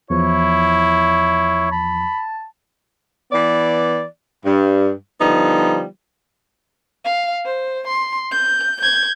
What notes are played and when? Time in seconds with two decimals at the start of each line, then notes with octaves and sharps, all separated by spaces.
0.10 E2 F3 E4 C#5
1.72 A5 B5
3.32 E3 B3 D5
4.45 G2
5.20 D3 F3 G3 B3 D#4
7.05 F5
7.45 C5
7.87 C6
8.31 G6
8.81 G6 G#6